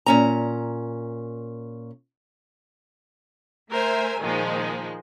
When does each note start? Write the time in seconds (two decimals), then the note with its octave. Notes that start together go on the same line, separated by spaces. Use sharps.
0.06 A#2 C#4 A#5
3.70 A3 A#4 C5 E5 G#5
4.19 A#2 D#3 F3 G#3